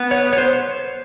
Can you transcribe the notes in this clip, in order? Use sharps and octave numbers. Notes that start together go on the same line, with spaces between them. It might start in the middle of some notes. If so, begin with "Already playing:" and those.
Already playing: B3
C#5
C#5
C5